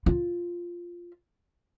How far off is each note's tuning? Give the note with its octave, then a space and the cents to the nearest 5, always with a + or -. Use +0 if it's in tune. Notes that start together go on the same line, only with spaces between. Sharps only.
F4 +0